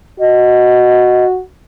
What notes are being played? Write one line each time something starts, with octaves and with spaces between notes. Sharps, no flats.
F#4 D#5